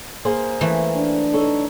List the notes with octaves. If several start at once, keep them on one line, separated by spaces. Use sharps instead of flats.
A#3 G#4 C5
E3 A3
D4
D#4 A4 C#5